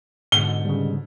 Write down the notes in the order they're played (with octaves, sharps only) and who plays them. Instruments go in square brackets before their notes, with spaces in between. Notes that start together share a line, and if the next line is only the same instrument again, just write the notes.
[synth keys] G#2 B2 D3 [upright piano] G7
[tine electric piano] C#3 G3